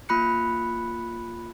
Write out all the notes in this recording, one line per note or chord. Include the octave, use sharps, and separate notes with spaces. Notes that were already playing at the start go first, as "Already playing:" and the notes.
A#3 F4 B5 F#6 C#7